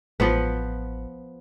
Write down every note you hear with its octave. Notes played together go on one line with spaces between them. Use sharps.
A1 F3 B3 B4